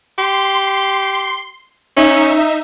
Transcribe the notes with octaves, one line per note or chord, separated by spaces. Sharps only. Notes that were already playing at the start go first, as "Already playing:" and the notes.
G4 C6
C#4 D#4 E5